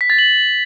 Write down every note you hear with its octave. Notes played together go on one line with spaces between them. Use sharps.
B6
A6
F#7